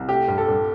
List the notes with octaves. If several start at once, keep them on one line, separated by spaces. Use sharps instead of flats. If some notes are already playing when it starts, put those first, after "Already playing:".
Already playing: C2
A3 G4
G2
A4
G2